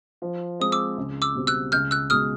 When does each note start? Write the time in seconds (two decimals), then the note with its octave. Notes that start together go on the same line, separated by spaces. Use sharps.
0.22 F3
0.60 G#3 C4 D#6
0.72 D6 E6
0.97 C#2
1.22 D6 E6
1.35 B2 G3 C4
1.47 E6 F#6
1.72 C#2 F6 G6
1.91 E6 F#6
2.10 B2 G#3 D#6 F6